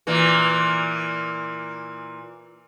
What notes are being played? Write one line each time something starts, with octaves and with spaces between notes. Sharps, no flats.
A#2 E3 A#3